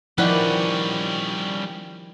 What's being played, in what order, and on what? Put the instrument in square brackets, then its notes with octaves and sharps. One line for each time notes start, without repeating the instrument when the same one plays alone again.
[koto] D#3 B4 F#5 [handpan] F3 E4 D5 [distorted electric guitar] G3 C#4